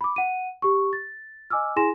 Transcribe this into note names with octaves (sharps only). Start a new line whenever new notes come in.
B5 D6
F#5 D#7
G4 C#6
A6
D#5 G#5 D6 E6 F6
E4 G#4 G#5 C6 A#6 E7